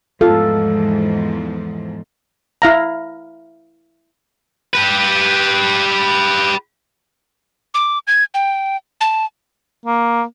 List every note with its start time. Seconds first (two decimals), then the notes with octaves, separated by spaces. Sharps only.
0.21 E2 G#2 F3 F4 A4
2.62 E4 F5 A#5
4.73 G4 B4
7.74 D6
8.07 G#6
8.34 G5
9.01 A5
9.86 A#3